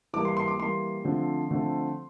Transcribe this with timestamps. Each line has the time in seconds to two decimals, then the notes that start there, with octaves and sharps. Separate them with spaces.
0.13 E3 G3 A#3 D6
0.25 C6
0.37 C6
0.48 D6
0.59 E3 G3 A#3 C6
1.04 D3 F3 A3 C4
1.51 D3 F3 A3 C4